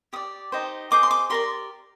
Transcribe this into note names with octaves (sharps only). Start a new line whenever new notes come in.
G4 D5 D#6
D#4 G4 C5 D#5
G#4 C5 D#5 D6
C6
D6
G4 A#4 D5 C6